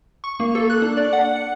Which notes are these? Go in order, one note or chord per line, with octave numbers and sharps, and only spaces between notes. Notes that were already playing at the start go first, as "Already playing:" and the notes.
C#6
A#3
A4
F#6
D4
D5
F#5
C#7